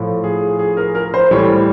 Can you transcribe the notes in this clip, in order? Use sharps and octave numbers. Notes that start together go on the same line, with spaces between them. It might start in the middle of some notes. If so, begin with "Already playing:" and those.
Already playing: A2 F3
G#4
G#4
A#4
A#4
C5
A2 E3 G3 C#5